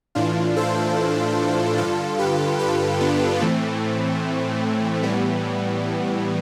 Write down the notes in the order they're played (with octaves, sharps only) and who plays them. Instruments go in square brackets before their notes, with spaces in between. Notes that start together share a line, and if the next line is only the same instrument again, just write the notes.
[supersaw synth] A2 E3 D4 F4
A4 C5
G2 D3 F4 A4
G4 B4
G4 B4
B3 D4
A2 E3 A3 C4
A2 E3 G3 B3